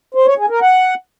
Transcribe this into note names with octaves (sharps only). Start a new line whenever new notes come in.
C5
C#5
G#4
A#4
F#5